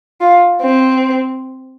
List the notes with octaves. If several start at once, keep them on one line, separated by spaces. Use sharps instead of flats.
F4
C4